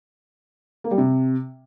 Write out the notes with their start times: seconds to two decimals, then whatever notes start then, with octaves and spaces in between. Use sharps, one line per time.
0.84 A#3
0.91 G3
0.98 C3